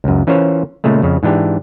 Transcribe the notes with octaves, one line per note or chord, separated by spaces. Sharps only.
C#2 F#2
E3 C#4 F4 A#4 C5 C#5
A#2 C#3 G#3 A3
F2 C#3
G#2 E3 D4 G4